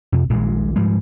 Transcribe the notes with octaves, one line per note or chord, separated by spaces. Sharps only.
F2 C3
D#1 A#1 A#2 G#3
G#2 F3 G3 G#3